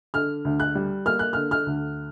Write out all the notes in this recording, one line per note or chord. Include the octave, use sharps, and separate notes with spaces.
D3 F6
D2
F#6
G3
A#3 F6
F#6
D3 F6
F6
D2